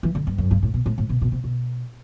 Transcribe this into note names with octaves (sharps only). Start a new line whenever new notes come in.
E3
D3
G2
F#2
G2
A2
B2
A2
A2
B2
B2
C3
B2